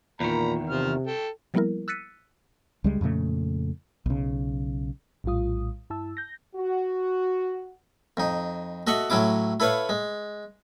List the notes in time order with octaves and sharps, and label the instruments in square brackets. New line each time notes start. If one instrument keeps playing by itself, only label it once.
[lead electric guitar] E2 D#3 [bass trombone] A#2 [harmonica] A#5 B5
[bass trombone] C3 [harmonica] F3 F6
[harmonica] A4 G5
[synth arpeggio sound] F3 G3 A#3 B3 E4 A#4
E6 F#6 A6 B6 C#7 D#7
[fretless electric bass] C#2 G3 G#3
F2 A#2 C#3 A3
B1 C#3
[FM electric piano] A#1 A2 G3 F4 D#6
G2 E4 A5 E6
G6 A#6
[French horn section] F#4
[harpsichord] F2 D#4
F#4 A4 D#5 E5 F#5
A2 F#3 C#4 E4 D6
E4 A4 B4 C#5 F5
G#3